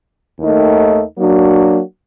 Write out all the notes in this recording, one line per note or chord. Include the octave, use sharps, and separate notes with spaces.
D#2 D#3 A3 D#4
F#3 A#3 D4 F#4